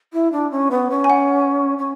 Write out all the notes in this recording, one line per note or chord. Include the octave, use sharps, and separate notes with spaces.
E4
D4
C#4
B3
C#4
G#5
F#5
C#4